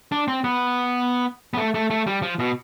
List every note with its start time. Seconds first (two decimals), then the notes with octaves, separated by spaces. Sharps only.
0.12 D4
0.28 C4
0.44 B3
1.54 B3
1.58 A3
1.74 A3
1.90 A3
2.07 G3
2.22 F3
2.39 B2